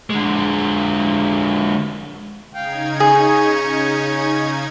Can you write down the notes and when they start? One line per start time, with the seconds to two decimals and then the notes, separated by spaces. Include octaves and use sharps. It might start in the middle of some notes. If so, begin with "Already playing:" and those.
0.10 D3 G#3
2.55 C#3 D#4 F5 G5 G#6
3.00 C#4 G#4 C#5